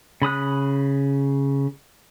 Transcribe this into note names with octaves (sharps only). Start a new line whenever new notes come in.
C#3 B5 D#6 F#6